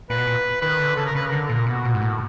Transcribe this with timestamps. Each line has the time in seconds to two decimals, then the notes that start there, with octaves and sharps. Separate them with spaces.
0.10 A#2 B4
0.18 B2
0.27 A#2
0.62 D#3 B4
0.79 D3
0.96 C#3 A4
1.06 A#4
1.15 C#3 B4
1.27 A#4
1.32 D3
1.46 A4
1.49 A#2 A#4
1.66 B2 F#4
1.85 A#2
1.94 G#2
2.02 A2